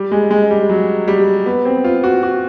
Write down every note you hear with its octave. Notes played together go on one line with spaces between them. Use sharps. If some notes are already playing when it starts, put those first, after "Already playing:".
Already playing: G3
G#3
G#3
G3
F#3
G3
B3
C4
F4
F#4
F#4